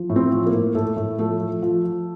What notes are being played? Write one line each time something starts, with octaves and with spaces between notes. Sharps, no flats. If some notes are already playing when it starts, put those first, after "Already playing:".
Already playing: F3
A2
C4
F3
A#3
A2
A2 A3
A2
F3 A3
F3
F3
F3